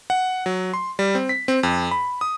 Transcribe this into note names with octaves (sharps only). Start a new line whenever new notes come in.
F#5
F#3
C6
G3
C4
B6
C4
F2
B5
D#6